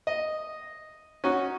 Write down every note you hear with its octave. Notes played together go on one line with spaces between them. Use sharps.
D#5
C#4 D#4 F#4